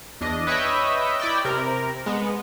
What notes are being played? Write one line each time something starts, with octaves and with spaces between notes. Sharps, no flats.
E2 D4 D#5
B4 C#5 D#5 E5 G5
E4 D5 G5
C3 A#4
G#3 B3